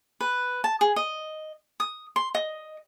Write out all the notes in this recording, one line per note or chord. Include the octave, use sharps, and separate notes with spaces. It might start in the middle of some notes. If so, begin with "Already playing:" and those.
B4
A5
G#4
D#5
D#6
C6
D#5